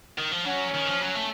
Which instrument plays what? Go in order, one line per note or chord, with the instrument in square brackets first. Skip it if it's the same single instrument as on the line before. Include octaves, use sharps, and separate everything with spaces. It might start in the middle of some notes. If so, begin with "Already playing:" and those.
[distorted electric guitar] D#3
F3
[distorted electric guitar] F#3 [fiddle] C#4
[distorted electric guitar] D#3
F3
F#3
A3